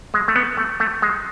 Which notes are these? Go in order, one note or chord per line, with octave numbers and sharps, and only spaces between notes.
G#3
A3
B3
A3
A3
G#3